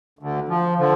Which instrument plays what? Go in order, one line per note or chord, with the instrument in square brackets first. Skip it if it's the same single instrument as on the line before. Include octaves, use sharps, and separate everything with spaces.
[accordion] D2 D3
F3
D3 F3